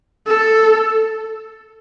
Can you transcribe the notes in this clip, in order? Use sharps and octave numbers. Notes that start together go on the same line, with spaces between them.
A4